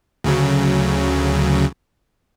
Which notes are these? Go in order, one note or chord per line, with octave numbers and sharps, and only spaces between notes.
D2 C#3 F#3